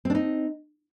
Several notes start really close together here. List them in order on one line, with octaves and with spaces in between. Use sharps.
C4 D4 D#4